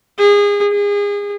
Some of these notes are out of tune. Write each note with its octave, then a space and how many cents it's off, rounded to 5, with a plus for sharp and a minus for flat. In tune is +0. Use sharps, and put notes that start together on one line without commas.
G#4 -30
G#4 -30